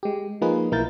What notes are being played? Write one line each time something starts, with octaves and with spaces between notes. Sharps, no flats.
G#3 G4
F3 A#3 D#4 F4 G#4 B4
B1 A#3 E4 A#4 G6 A6